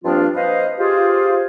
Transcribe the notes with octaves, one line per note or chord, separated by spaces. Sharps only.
G2 F3 A#3 C4 D4 F4
B4 C5 D#5 F5
F4 G4 G#4 C5